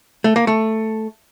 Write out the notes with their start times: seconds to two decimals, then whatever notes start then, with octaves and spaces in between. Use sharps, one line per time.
0.24 A3
0.36 A#3
0.47 A3